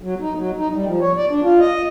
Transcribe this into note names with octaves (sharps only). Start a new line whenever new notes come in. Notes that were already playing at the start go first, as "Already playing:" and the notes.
F#3
D#4
F#3
D#4
G3
F3
C#5
D5
D4
F4
D#5